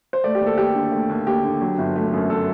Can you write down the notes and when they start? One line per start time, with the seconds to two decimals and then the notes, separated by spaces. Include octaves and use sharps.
0.13 C5
0.24 A3 D5
0.35 G4
0.41 D#2
0.46 A4
0.58 D#2 G4
0.75 D3
0.92 A3
1.09 D#2
1.26 D#2 G4
1.44 D3
1.62 F#3
1.78 G1
1.96 A3
2.13 F#2
2.30 F#3 A4